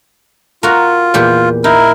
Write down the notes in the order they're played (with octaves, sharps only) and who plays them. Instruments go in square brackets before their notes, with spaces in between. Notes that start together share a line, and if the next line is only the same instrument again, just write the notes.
[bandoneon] F4 [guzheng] F#4 A#4
[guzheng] E2 A#2 G4
[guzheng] D#4 [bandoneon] E4 A#4